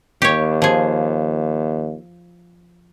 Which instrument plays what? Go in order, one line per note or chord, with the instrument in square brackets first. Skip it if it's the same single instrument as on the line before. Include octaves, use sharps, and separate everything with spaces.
[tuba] D#2 [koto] G4 C#5
[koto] F3 G#4